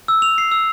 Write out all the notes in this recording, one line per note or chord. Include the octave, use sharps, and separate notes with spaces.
E6
F7
C7
E6